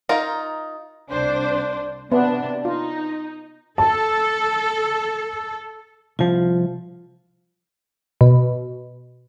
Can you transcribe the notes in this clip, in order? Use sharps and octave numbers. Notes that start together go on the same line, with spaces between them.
D#4 F4 A#4
C2 D4 C5
C3 B3 D4
D#4 F4
A4 A5
C2 F3 F4
B2